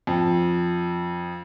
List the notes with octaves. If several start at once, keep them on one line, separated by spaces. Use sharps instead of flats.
F2